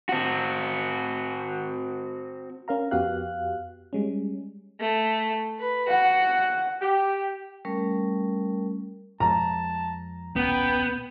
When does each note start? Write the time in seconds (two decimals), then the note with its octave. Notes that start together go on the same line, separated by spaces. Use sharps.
0.09 C4 F#4
2.68 C#4 A#4 F5 A#5
2.91 F2 B3 F#4 G4 F5 F#6
3.93 G3 G#3 C#4
4.80 A3
5.59 B4
5.88 F#4 F#5
6.81 G4
7.65 G3 A3 C#4 A#4
9.20 F2 F3 G#3 A5 A#5
10.36 D#1 B1 B3 C#4 G5